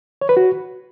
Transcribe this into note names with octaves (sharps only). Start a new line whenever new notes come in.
C#5
B4
F#4